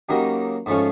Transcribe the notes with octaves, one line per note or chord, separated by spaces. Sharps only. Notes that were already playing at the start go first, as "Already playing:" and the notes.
C#3 F#3 A#3 D#4 G4
G#2 F3 A3 C#4 F4